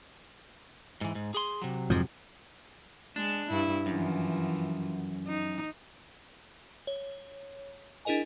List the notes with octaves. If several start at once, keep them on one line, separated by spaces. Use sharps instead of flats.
G#2 E3
G#2
G#4 C6
C3 F#3
F2 G#2 F3
G#3 D4
G2 E4
F#2 E3 F3
D#4
C#5
D4 E4 G#4 A#4 D#5 G#5